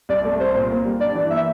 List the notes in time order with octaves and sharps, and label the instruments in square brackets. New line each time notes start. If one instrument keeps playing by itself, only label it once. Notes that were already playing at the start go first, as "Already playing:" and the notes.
[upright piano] C2 [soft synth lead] D5
[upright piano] A3
[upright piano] C2 [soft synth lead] C5
[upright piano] A#2
A#3
G3
[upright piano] G2 [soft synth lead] D5
[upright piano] E3
[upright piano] A#3 [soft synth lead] E5